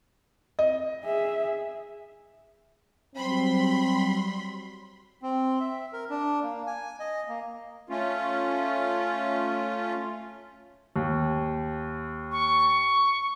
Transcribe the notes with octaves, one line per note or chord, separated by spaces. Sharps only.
D#5
G#4 E5
F#3 G3 C4 B5 C6
C4
E5
A#4
D4
A#3
G#5
D#5
A#3
A3 C#4 F4
D#2
C#6